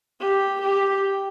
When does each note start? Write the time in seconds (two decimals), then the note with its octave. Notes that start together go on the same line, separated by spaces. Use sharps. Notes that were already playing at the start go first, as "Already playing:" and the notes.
0.20 G4
0.60 G4